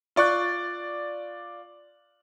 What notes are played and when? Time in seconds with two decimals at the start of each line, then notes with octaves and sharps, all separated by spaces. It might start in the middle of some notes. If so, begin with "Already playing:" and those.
0.16 F4 D5 C#6 F#6